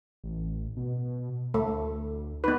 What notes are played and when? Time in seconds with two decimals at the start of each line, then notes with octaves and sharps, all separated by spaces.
0.24 A1
0.77 B2
1.54 D2 A3
2.44 B3 D#4 B4